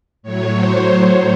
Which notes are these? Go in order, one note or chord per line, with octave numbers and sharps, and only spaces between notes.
A2 F#3 C#5
C5